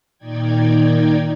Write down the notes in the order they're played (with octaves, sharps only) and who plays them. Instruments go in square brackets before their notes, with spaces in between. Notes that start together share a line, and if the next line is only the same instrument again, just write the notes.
[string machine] A#2 D#3 D#4 D5 G5 G#6